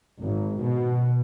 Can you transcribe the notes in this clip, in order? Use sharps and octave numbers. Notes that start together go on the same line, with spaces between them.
G#1
B2